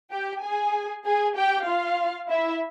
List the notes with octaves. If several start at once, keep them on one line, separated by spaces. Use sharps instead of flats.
G4 G5
G#4 G#5
G#4 G#5
G4 G5
F4 F5
E4 E5